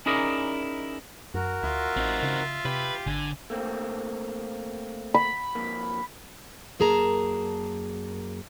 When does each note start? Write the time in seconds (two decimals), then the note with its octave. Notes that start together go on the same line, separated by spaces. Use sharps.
0.06 C#4 D#4 E4 G#4 A#4 D5
1.34 F#2 F#4 A#4
1.63 D2 F4 E5
1.97 A1 C4 D#4
2.23 C#3
2.65 C3 G4 B4
3.07 G#1 D3 G#5
3.50 A3 A#3 C4
5.14 B5
5.55 F2 A#3
6.80 F#2 A#3 G#4 A5 A#5